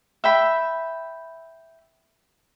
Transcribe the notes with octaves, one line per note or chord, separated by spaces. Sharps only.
E5 G5 B5